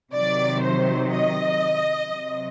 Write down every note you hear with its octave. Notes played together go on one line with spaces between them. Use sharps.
C3 D#3 F#3 D5
C5
D#5
C3 F#3